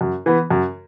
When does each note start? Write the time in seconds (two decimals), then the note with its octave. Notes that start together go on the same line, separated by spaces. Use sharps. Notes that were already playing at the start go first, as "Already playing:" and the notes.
0.01 F#2
0.26 E3 B3
0.51 F#2